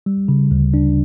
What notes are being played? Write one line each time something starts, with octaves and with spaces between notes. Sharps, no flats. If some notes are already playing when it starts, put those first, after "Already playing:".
G3
C#3
D2
D4